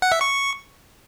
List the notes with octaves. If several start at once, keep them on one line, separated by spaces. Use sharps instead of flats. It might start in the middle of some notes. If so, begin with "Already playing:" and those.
F#5
E5
C#6